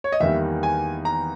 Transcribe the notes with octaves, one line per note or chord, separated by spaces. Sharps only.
C#5
D#5
E2 D#3 G3 A#3 E5
G#5
A#5